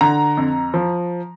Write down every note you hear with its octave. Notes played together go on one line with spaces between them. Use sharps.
D3 A#5
F2
F3